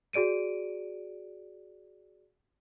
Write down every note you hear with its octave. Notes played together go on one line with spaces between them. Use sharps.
F#4 G#4 D5 D7 D#7